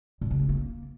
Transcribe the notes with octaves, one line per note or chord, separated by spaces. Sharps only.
A#2
C#3
C4
A#3